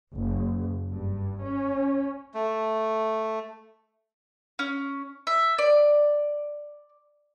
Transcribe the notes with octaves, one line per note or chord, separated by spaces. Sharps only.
F#1
G2
C#4
A3
C#4
E5
D5